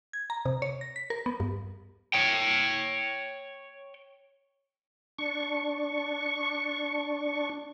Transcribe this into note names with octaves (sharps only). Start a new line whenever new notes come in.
G#6
A#5
C3
C#5
A#6
B6
A#4
B3
G2
C#5 G5
D4 C#6